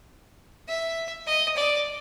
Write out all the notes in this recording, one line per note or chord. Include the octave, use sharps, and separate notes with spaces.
E5
D#5
D5